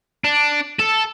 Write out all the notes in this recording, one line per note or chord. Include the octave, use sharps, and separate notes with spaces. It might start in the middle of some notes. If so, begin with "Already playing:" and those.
D4
A4